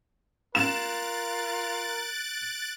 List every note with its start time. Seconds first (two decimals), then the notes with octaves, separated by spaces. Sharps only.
0.55 F4 A#4 F#6 A6 D7 E7